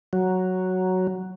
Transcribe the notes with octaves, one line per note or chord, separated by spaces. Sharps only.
F#3